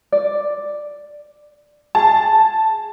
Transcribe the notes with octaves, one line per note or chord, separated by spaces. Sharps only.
D5
G#4 A5